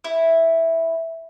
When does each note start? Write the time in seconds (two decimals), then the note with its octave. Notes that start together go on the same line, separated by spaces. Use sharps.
0.04 E4